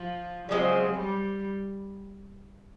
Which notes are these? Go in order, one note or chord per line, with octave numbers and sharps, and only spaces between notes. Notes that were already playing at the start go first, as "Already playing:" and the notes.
Already playing: F3
C#3 F3 F#3 G#3 C4
G3